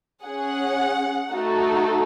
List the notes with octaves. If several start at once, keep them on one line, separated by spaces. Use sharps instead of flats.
C#4 G#4 F#5
A3 D#4 F#4 A4